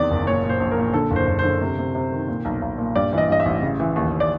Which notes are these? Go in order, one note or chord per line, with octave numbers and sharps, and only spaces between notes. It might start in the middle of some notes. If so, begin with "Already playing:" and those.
Already playing: E2 C3 D#3 D5
F#1
A#2 C#5
A#2
C5
A#1
A#4
A#2
D3 A4
F#1
C5
F#1
C5
D3
C3
C3
C3
D#3
A#2
B1
B1
A#2
G2 D5
E3 D#5
G2 D#5
E5
A1
C#3
E3
D#2
D#2
D5